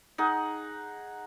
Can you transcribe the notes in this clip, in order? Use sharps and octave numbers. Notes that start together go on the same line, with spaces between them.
D#4 G#4 F#5